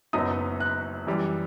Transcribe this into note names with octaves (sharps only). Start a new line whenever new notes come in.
F#1 F#2 F#3 B3 D#4 D#6
F#6
F#2 E3 G3